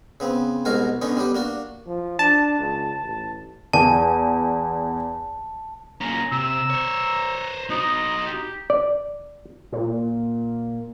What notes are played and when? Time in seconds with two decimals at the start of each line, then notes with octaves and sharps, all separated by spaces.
0.20 C#3 B3 C4
0.65 C2 G#2 B2 F#4 A#4 F5
1.02 D3 B3 C#4 D#4
1.17 G3 B3 G4
1.35 A#3 D4 F#4
1.87 F3
2.19 D4 A5
2.59 C#2
3.02 A1
3.73 E2 A5
6.01 C#2 A#3 C#4 F4 G#5 A#5
6.32 C3 A#5 E6
6.70 C5 C#5
7.70 D#4 F#4 D#5
8.26 G4
8.70 D5
9.72 A#2